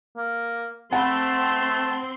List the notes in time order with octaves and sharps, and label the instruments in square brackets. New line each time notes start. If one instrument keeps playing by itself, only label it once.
[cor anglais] A#3
[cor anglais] A3 [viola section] C4 C6 [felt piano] F#5 B5 [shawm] A5